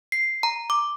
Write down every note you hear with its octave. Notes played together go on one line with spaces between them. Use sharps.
C7
A#5
D6